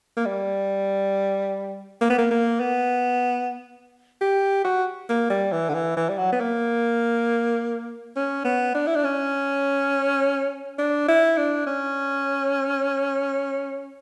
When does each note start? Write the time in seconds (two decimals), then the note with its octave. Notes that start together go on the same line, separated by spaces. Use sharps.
0.17 A#3
0.26 G3
2.01 A#3
2.10 B3
2.18 A#3
2.31 A#3
2.60 B3
4.21 G4
4.65 F#4
5.09 A#3
5.30 G3
5.52 E3
5.69 D3
5.74 E3
5.97 E3
6.09 G3
6.18 F#3
6.33 B3
6.40 A#3
8.16 C#4
8.45 B3
8.75 D4
8.87 E4
8.95 D4
9.04 C#4
10.79 D4
11.08 E4
11.37 D4
11.66 C#4